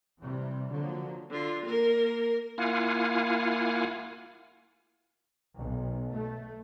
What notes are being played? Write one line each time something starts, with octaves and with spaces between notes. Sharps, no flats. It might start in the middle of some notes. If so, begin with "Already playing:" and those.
C3 E3 G3
D3 F3 F#3 A#3
D3 F4
A#3 A#4
A#3 E4 F4 F5 F#5 G#5
B1
A3